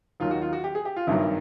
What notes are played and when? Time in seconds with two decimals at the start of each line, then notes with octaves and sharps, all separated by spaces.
0.20 D#2 D#3 F#3 F4
0.31 F#4
0.42 F4
0.53 F#4
0.64 G4
0.75 G#4
0.85 G4
0.96 F4
1.07 G#1 G2 D#3 F#3 E4